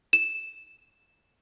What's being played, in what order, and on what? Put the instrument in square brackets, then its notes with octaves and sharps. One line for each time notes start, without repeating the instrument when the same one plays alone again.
[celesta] E7